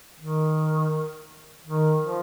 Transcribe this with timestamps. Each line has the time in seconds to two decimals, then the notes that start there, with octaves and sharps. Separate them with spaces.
0.19 D#3
1.66 D#3
2.02 F3